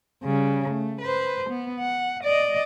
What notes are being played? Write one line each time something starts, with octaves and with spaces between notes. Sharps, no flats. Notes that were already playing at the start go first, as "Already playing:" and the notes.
C#3 G3
A3
B4 C5
B3
F#5
D5 D#5